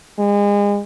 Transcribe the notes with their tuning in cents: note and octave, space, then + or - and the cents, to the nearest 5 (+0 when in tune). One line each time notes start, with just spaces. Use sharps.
G#3 -35